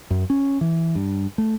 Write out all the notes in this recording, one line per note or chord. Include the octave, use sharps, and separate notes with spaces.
F#2
C#4
E3
G2
A3